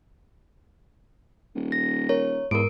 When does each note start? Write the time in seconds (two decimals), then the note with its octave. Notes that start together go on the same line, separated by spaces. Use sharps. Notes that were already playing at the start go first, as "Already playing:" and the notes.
1.56 D#1
1.72 A#6
2.09 A#4 C#5
2.51 E2 G#2 A#4 D7